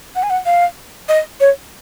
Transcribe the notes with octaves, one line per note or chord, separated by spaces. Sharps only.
F#5
G#5
F#5
F5
D#5
C#5